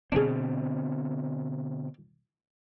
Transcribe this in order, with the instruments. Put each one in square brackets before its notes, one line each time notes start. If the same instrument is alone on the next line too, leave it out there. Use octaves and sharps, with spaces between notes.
[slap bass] B2 D3 C4 [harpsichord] D4 G#4